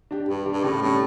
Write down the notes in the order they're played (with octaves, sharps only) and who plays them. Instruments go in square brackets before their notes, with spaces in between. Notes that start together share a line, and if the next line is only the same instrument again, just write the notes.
[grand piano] D4 G4
[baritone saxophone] G2 [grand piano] G3
[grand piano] D4 G4
[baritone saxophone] G2
[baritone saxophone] A2 [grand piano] C#3
[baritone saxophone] A2 [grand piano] G3 C#4